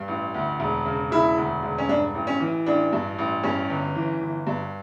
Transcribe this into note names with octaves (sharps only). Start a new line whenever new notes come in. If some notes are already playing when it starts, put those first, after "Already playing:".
Already playing: G2
A1
D2
E1
C#3
E1 E4
D2
E1
C#4
G2 D4
A1
C#4
E3
A1 D4
G2
A1
G2 C#4
G1
E3
G1
G2